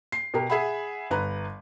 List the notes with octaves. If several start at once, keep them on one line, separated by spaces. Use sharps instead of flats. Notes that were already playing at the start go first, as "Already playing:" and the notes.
C7
B2 G4 A#4
G#4 E5 F#5 B5
G1 B4 A#5